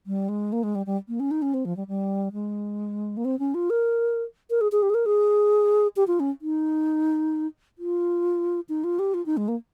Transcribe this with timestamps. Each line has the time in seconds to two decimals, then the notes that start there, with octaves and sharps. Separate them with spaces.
0.07 G3
0.29 G#3
0.53 A#3
0.63 G#3
0.75 G3
0.86 G3
1.08 A#3
1.20 C#4
1.31 D#4
1.42 C#4
1.54 C4
1.65 F3
1.77 G3
1.88 G3
2.33 G#3
3.17 A#3
3.25 C4
3.39 C#4
3.54 F4
3.70 A#4
4.50 A#4
4.61 G#4
4.72 G#4
4.83 G4
4.90 G#4
4.94 A#4
5.06 G#4
5.96 G4
6.07 F4
6.20 C#4
6.42 D#4
7.79 F4
8.69 D#4
8.84 F4
8.99 G4
9.14 F4
9.26 D#4
9.37 G#3
9.48 A#3